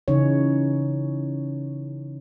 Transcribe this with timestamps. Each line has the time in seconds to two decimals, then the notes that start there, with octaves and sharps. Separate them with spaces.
0.08 C#3 E3 C#4 D#4 C#5